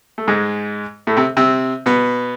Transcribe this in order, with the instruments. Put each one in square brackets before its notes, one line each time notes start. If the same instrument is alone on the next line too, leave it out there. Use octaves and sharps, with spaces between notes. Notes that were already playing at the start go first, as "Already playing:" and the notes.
[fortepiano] A3
G#2 G#3
A2 A3
C3 C4
C3 C4
B2 B3